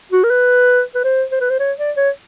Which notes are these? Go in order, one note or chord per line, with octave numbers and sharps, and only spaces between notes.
F#4
A#4
B4
B4
C5
C5
B4
C5
C#5
D5
C#5